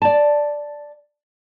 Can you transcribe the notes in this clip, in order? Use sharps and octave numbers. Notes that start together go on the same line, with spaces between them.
D5 A5